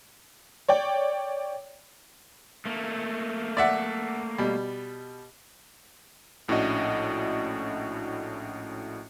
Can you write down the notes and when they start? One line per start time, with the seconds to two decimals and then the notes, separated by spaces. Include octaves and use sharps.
0.68 C#5 D5 G5
2.65 A3 A#3
3.57 D5 E5 F#5
4.38 B2 G3
6.48 A#1 A2 C#4 D4 F#4 D#5